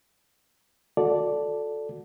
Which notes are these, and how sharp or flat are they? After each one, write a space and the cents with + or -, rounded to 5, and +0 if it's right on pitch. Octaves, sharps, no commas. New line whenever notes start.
F#4 -30 A4 +0 D5 -5